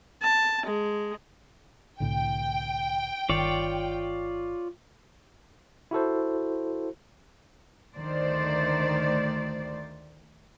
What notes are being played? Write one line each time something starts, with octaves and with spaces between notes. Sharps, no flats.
A5
G#3
C2 A2 D3 G5
G1 D#3 F4 C#5 D5
E4 F#4 A4 C5
D2 D#3 A3 C5 D5